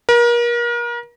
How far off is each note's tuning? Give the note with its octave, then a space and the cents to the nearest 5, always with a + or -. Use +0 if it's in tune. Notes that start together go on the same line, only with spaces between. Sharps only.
A#4 +35